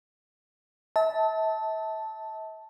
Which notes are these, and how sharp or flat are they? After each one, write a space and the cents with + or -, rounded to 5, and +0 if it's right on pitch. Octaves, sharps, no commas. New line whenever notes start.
E5 -40 A5 +0